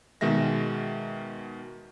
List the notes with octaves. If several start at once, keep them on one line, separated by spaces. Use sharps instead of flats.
B2 D#3 G#3 E5 A#6